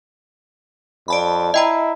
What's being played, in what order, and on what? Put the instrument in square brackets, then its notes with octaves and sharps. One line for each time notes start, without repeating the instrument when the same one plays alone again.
[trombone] F2 [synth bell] D5 A5 B5
[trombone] E4 [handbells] D#5 G5 A#5